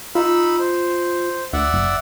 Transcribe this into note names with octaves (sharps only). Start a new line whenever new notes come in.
D#4 F4 B5 E6
C5
D2 D5 E5 F#5
F#1